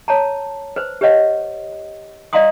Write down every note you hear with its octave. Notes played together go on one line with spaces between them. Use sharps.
C#5 A5 A#5
B4 C5
G4 B4 C#5 D#5 F#5
D5 D#5 F5 A#5 C6 D#6